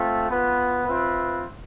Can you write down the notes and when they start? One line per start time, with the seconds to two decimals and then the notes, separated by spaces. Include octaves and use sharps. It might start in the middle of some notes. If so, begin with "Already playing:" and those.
Already playing: A3 C4 F4 A4
0.29 B3 F4 B4
0.87 C4 F4 B4 E5